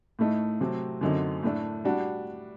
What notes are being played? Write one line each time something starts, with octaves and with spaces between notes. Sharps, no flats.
A2 A3 D#4
C3 F#3 A3 C4
F#2 D3 F#3 C4 D#4
A2 A3 D4
G3 D4 F#4